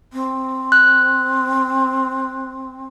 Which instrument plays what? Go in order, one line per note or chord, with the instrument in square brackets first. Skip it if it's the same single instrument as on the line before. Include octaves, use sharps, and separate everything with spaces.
[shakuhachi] C4
[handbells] F#6